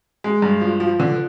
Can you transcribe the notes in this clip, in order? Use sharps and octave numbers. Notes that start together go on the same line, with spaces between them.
G#3
G2
F3
F3
D3